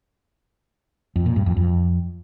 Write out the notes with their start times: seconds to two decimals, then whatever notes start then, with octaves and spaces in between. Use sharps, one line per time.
1.16 F2
1.26 A#2
1.36 G2
1.46 F2
1.57 F2